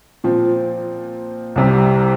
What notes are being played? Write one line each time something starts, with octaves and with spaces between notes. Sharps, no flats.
A#2 F3 C4
C2 C3 G3